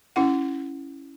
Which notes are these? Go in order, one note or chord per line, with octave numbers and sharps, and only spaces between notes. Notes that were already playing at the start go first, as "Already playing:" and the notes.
C#4 E4 F#5